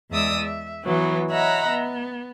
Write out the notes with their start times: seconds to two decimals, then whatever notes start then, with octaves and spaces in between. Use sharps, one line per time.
0.11 E2 G#3 D5 E5 D#6 E6
0.41 E5
0.85 E3 F#3 B3
1.30 C#5 D#5 E5 F#5 A#5 B5
1.69 B3